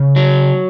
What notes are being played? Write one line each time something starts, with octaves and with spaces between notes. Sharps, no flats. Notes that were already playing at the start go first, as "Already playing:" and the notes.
Already playing: C#3
F#3